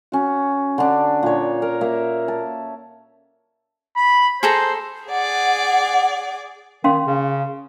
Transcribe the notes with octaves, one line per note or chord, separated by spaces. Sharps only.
C#4 F#4
D3 D4
A#2 C#5
A#4
A#3 E5
A5
B5
G#4 A4 C5 A#5
G#4 D5 F#5
D#3 C#4 F5 C6
C#3